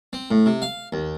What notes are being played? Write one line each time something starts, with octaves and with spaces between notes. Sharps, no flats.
C4
A2
C3
F5
D#2